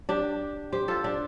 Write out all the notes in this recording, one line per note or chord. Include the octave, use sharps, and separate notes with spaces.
D4 G4
G4 C5
F4 A4
D4 G4